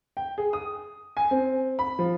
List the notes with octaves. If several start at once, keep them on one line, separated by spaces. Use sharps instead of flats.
G5
G#4
D#6
G#5
C4
B5
F3